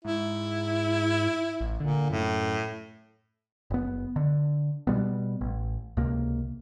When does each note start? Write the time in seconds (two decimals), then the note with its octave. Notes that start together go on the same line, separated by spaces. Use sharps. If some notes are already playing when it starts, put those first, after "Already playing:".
0.04 G#2 E4
1.60 A1
1.80 A#2 D3
2.10 F#2 A2
3.70 F#1 B3
4.16 D3
4.87 B2 G3 B3
5.41 A1
5.97 C#2 C3 A#3